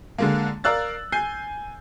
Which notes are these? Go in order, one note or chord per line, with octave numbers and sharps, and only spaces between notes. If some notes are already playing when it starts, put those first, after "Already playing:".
D3 G#3 A#3
A#4 D5 F5 E6 F#6 A6
G#5 G6 C7